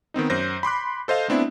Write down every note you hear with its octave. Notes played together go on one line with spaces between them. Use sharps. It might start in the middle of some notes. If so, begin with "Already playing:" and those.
D#3 B3 C4 D#4
F#2 C5 G6 A#6
B5 C6 D6 F#6
A4 C5 D#5 F5
A3 B3 C4 D4 E4